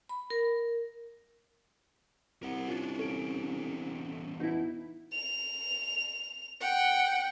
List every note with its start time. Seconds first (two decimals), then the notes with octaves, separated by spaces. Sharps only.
0.09 B5
0.30 A#4
2.43 C2 A#4 F#5
2.68 C#4 D4 F4
2.99 E2 C#4 A4 D7
4.40 B2 D#4 E4
5.13 F7
6.61 F#5 G5